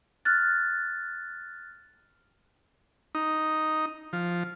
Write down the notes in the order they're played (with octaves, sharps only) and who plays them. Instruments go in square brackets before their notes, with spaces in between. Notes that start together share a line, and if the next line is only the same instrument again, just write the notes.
[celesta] F6 F#6 A6
[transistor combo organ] D#4
F3